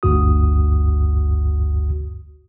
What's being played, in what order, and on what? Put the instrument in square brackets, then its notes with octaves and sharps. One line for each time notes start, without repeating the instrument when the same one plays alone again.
[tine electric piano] G1 D2 G2 F#4 D#6